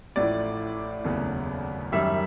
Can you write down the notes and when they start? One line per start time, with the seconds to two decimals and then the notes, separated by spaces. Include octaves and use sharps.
0.16 A1 A2 F3 A3 D5
1.04 F1 D#2 C#3 F#3 B3
1.92 F#2 D#3 G3 E5